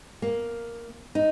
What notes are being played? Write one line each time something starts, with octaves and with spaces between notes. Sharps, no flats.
A#3
D#4